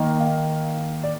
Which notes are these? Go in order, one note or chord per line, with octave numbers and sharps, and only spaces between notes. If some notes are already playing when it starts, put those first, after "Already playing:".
Already playing: D#3 A#3 D#4
F5
D5